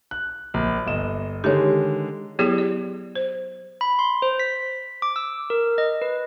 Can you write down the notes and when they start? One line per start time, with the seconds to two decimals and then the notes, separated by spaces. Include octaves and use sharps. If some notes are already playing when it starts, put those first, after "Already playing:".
0.11 F#6
0.54 A#1
0.87 G1 D#5 E7
1.44 D3 D#3 G#3 G4 C#5
2.39 F#3 B3 E4 G4 G#4 D5
2.58 D5
3.16 C5
3.81 B5
3.99 C6
4.22 C5
4.39 B6
5.02 D6
5.16 E6
5.50 A#4
5.78 D#5
6.02 B4